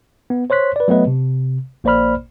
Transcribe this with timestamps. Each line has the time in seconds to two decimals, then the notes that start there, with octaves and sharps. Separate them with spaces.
0.30 B3
0.50 C5 C#5 C6 F#6 B6
0.76 B4 D5
0.88 F#3 A3 B3 B4 D#5
1.07 C3
1.84 A#1 A#3 C5 D5 B5 F6